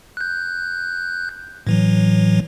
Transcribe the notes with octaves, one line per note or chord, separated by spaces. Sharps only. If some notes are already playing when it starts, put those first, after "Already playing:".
F#6 G6
A2 E3 F#3